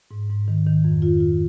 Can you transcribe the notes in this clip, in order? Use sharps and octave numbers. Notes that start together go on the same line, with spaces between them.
G#2
G#2
D#3
D#3
F2
F4
F4